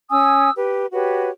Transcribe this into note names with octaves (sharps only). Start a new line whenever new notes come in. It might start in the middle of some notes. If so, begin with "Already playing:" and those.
C#4 G#5 D#6 E6
G4 B4
F#4 G4 B4 C#5